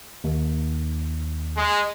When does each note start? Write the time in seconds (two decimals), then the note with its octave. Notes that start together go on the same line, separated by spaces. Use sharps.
0.24 D#2
1.57 G#3